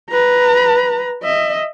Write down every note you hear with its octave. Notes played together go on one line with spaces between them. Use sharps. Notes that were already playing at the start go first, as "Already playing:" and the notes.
B4 A#5
D#5 E5